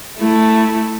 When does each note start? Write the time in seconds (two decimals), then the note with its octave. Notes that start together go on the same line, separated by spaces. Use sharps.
0.19 A3 E4